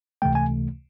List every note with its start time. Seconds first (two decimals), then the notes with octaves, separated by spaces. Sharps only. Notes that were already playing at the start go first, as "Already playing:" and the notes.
0.22 C#2 C3 E3 A3 G5
0.35 G#5